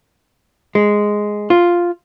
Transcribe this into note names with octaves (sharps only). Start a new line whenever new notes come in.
G#3
F4